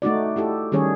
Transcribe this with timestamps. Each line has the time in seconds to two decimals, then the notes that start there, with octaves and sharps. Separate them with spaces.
0.02 A3 D#4 F#4 D5
0.36 E4 G4 A4
0.72 D#3 G3 C#4 G#4 C#5